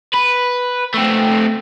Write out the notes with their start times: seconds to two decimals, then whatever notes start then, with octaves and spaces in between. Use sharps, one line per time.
0.14 B4
0.94 A3 C4